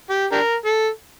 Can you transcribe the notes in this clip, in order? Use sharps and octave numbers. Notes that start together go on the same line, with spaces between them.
G4
D4 G4 A#4
A4